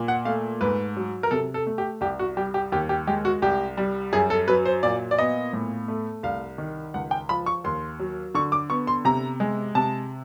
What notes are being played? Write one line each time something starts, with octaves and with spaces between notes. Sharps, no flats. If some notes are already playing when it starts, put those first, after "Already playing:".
Already playing: A#2
F#5
A3 F5
G#2 B4
F#3
A#4
C3 A4
A4
A3
G4
C2 G4
F#4
G3 G4
G4
D#2 G4
G4
G#3 G4
F#4
C2 G4
G3
F#2 G#4
A4
F#3 B4
C5
A#2 D5
D5
B3 D#5
A2
A3
C2 F5
D#3
C#2 F#5
G5
F3 B5
C#6
D#2 C6
F#3
D3 C#6
D6
B3 C#6
C6
C3 A#5
G#3
C3 A5